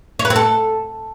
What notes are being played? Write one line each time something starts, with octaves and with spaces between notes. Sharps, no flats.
C#5
B4
C4
A4